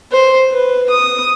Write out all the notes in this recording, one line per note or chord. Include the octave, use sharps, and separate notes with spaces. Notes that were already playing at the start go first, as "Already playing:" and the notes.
C5
B4
D#6